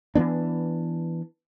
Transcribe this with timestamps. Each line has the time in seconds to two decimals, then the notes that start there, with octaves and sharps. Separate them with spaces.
0.15 E3 F#3 B3 D4